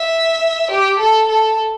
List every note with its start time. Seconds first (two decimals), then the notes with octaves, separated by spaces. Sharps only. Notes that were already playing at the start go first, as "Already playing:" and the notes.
Already playing: E5
0.71 G4
0.99 A4
1.29 A4